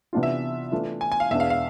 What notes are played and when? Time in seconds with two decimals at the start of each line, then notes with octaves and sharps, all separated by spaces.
0.13 C3 E3 B3 D4 F4
0.23 E5
0.72 E3 A3 D4 F4
1.01 G#5
1.12 G#5
1.20 F5
1.31 E2 B2 G#3 D4 E5
1.40 F5
1.50 F5